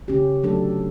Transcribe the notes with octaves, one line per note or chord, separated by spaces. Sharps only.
C#3 C#4 G4
F#3 A3 D4 A4